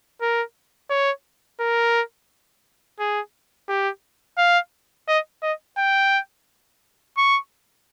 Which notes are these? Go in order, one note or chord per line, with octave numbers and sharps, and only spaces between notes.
A#4
C#5
A#4
G#4
G4
F5
D#5
D#5
G5
C#6